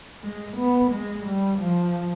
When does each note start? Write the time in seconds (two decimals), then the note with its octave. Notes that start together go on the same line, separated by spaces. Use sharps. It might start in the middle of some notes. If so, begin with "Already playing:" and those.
0.23 G#3
0.57 B3
0.92 G#3
1.26 G3
1.60 F3